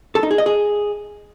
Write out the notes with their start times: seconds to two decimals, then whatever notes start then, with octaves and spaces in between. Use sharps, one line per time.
0.15 A4
0.23 D#4
0.31 G#4
0.38 D#5
0.46 G#4